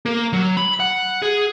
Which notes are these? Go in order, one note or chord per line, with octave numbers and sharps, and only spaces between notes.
A#3
F#3
B5
F#5
G#4